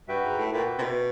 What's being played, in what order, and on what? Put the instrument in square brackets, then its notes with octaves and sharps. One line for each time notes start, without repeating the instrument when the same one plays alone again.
[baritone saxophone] G2 [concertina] F#4 B4 E5 G5
[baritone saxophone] G#2
A2
[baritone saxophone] A#2 [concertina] F#4 B4 E5 G5
[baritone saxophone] C3
B2